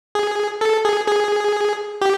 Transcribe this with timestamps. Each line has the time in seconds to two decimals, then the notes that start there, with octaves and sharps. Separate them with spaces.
0.15 G#4
0.61 A4
0.85 G#4
1.08 G#4
2.01 G4